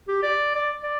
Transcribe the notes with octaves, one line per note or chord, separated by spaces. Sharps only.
G4
D5
D5
D5